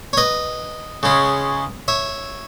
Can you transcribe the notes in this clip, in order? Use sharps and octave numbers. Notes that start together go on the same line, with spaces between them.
C#5
B4 D#5
C#3 G#3 C#4
C#5 E5